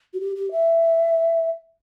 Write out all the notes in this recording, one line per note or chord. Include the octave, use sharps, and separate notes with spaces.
F#4
G4
G4
E5